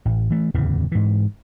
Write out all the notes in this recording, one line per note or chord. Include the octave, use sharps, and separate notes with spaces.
A1
E3 A3
D1 E2 C#3 E3
G#2 E3